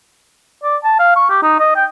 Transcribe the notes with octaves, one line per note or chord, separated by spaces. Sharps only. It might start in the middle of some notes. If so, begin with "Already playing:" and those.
D5
A5
F5
C#6
G4
D#4
D#5
G5